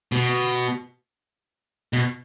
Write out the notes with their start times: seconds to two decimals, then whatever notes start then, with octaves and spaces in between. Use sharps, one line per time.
0.12 B2
1.93 B2